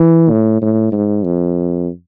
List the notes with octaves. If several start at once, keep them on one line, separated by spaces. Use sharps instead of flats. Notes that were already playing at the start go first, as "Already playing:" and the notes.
Already playing: E3
A2
A2
G#2
F2